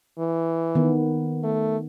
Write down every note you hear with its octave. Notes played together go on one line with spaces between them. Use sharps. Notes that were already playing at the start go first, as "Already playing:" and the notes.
E3
D#3 B3
A3